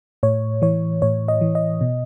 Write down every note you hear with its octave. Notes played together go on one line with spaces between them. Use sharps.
A2 C#5
E3 C#5
A2 C#5
D#5
E3
D#5
B2